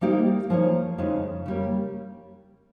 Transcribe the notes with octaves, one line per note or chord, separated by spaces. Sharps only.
G3 A#3 D#4 G4 C5
F3 A#3 D#4 G#4 C#5
F2 C#3 G#3 D#4
C#3 G3 A#3